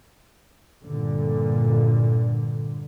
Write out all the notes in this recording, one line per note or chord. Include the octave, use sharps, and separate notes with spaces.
G2 A#2 D3